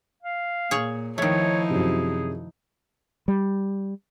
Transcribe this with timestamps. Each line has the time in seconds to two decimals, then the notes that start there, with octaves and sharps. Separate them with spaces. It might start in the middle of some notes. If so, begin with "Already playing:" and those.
0.23 F5
0.71 A#2 G#4 C#5
1.18 D#3 F3 A3 D#4 E4 C#5
1.70 F#2 C3 G#4
3.28 G3